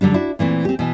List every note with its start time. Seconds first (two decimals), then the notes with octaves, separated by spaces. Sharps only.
0.01 D3 F#3 G3 D4
0.14 D4 E4 F#4
0.39 A#2 E3 A3 C4
0.65 C4 G4
0.79 B2 E3